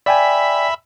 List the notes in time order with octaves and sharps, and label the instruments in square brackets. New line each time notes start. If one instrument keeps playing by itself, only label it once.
[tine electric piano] D5 G5 G#5 [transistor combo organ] E5 B5